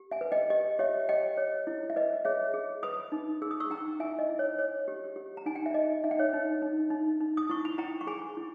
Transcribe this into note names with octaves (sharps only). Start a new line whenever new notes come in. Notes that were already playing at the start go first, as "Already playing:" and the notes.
Already playing: G4
E5 G#5
B4
D#5 G5
G4 D#5
G4 C#5 E5
G4 D#5 G5
C#5
E4
E5
B4 D#5
G#4 C#5 E5
G#4
B4 B5 D#6
D#4
G#4 E6
D#6
C#6 E6
D#4 G5 A#5
E4 E5 G#5
D#5
E4
C#5
C#5
G4
G4
A#5
D#4 G#5
G5
E5
D#4 D#5
D#4 E5
G5
C#5 E5
D#4
D#4
D#4
D#4
D#6
E4 C#6
B5
E4 G5 A#5
C#6
G#4 G#5 B5
E4